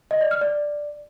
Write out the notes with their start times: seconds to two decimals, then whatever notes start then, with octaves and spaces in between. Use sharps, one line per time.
0.11 D#5
0.21 D5
0.31 F6
0.41 D5